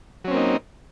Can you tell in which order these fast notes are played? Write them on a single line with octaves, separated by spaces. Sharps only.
F#3 C#4 C4 A#3 D#4